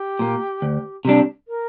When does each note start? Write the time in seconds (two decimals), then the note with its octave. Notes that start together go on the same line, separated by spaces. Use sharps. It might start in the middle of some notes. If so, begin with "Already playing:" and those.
Already playing: G4
0.19 A#2 A#3
0.62 D2
1.05 C3 G3 D4
1.48 A#4